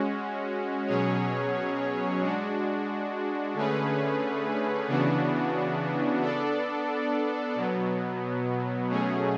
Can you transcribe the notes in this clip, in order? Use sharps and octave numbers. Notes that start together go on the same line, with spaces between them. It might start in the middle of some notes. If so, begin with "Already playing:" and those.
Already playing: G#3 C#4 F#4
B2 F#3 C#4 G#4 C#5
G#3 D4 F#4
D3 A3 C#4 G#4 B4
C#3 E3 B3 D4 F#4
B3 D4 A4 D5
B2 F#3 B3
B2 F#3 A3 C#4 G#4